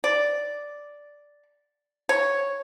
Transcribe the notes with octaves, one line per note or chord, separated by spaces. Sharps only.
D5
C#5